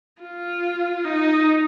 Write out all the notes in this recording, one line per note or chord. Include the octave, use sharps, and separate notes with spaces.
F4
D#4